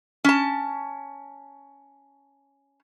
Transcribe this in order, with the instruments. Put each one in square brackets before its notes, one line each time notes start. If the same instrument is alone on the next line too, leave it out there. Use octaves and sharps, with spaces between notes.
[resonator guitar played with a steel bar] C#4 A5